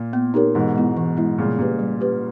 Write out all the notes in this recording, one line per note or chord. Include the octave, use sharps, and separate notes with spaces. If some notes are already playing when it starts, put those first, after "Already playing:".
Already playing: A#2
B3
D#4 G4 A#4 C#5
G#2 B2 E3
G#3 B3 E4
E3
G#3 B3 E4
A#2 C#3 G3
A#2 C#4 G4 B4
G3
C#4 G4 B4